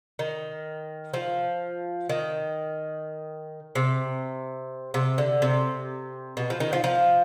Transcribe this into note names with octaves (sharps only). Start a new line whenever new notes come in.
D#3
F3
D#3
C3
C3
D3
C3
B2
F3
D#3
F3
F3